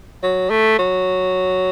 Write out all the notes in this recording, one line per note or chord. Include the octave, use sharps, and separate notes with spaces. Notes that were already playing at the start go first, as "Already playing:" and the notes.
F#3
A3
F#3